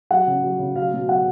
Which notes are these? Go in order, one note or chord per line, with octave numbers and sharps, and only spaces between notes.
F#3 F#5
C#3
F#3
C#3
F#3 F5
B2
F#3 F#5